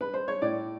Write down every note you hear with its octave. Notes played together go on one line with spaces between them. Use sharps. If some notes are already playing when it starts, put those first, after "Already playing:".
B4
C5
C#5
A2 D5